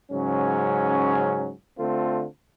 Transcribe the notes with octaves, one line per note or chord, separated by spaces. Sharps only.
G#2 C#3 F#3 C#4
D3 A3 C4 F4 A4